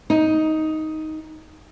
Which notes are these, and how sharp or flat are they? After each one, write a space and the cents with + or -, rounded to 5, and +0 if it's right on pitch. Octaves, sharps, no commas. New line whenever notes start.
D#4 +10